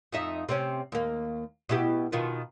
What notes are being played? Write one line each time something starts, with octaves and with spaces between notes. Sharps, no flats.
F2 D#4 E5
C3 C4 C#4
D#2 A#3
B2 E4 G4
B2 D#3 F4